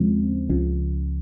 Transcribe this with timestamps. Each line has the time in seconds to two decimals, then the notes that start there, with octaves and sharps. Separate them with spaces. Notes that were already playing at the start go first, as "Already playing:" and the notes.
Already playing: D#2 C#3 F3 G#3 C4
0.50 C#2 C#3 F3